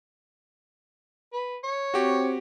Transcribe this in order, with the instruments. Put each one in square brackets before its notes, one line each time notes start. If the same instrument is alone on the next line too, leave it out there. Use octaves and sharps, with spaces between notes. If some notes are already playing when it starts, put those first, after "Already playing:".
[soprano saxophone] B4
C#5
[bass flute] C4 [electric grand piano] F#4 G4